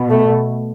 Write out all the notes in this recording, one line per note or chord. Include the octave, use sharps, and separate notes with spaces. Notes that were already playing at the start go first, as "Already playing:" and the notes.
Already playing: B2
A3